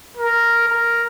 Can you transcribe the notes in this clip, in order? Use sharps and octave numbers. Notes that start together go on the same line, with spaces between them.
A#4
A#4